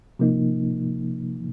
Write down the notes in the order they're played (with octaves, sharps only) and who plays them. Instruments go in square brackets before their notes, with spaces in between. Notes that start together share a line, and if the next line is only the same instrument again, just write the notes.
[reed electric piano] C3 F3 A#3 D#4